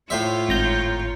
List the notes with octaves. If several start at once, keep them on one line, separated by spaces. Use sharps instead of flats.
A2 F4 C5 C#5 E5
G#1 A#5 G6